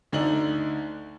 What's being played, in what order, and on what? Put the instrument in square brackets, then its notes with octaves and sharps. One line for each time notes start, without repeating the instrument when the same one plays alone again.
[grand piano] D2 D3 D#4 D5 D#5 F#7